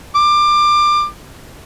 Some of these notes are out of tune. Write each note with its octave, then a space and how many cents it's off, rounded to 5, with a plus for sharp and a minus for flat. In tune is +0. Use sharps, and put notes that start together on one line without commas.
D6 +20